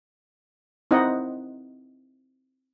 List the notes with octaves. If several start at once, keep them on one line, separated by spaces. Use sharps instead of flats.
C4 D#4 E4 C5 D#5 F#5